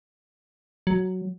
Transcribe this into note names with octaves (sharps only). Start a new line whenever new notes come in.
F#3